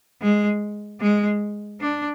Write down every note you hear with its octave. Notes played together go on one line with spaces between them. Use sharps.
G#3
G#3
D4